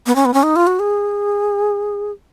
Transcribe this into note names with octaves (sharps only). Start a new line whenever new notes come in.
B3
C#4
B3
C#4
D#4
F4
F#4
G#4